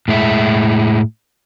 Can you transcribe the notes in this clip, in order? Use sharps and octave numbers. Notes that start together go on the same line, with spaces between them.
A2 G#3 E4